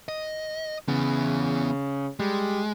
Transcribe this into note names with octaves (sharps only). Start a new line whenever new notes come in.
D#5
C#3 E3 B3
G3 G#3